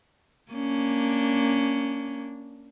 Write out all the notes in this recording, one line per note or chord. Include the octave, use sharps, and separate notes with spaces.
A#3 C#4 D4